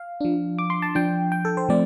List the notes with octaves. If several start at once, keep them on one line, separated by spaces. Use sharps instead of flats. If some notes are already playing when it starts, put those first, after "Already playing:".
Already playing: F5
F3 D4
D6
C6
A5
F3 D4 G5
G5
A4
C5
F3 A3 C4 D5